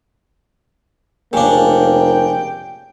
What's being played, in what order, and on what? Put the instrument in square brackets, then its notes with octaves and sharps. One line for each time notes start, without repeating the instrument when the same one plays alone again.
[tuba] F1 [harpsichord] C#3 D4 [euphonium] A#3 [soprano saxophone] G5